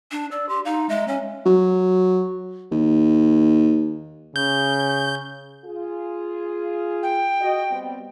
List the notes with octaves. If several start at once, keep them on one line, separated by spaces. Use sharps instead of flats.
D4
D5 E6
G4 C6
D#4 F5
G#3 E5
C#4 C#5
F#3
D#2
C#3 G6
F4 G#4
G5
F#4 D#5
G3 B3 C4